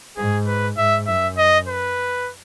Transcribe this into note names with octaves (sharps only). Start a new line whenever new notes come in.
G#2 G#4
B4
G#2 E5
F#2 E5
D#5
B4